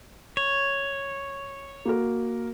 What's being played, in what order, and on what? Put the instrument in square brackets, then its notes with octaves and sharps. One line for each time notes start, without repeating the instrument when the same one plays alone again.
[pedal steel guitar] C#5
[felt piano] A#3 F#4 A#4